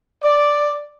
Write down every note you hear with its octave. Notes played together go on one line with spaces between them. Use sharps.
D5